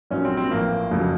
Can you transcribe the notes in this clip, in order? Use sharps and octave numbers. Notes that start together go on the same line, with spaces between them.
A#1 A#2 F#3 C#4
C4
C4
A1 A2 F3 A#3
F1 F2 C#3 F#3